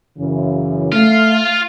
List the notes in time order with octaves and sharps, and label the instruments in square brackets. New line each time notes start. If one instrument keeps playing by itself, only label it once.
[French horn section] F#2 C#3 E3
[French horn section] A3 [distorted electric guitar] F4